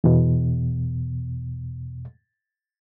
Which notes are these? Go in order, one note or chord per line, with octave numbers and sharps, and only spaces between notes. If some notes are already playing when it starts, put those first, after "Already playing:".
E2 B2